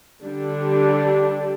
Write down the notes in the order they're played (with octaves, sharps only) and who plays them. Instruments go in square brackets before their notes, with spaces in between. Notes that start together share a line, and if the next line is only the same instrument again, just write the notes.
[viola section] D3 G3 D4 G4